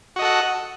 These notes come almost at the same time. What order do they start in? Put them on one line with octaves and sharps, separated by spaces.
F#4 D#5 A4 F#5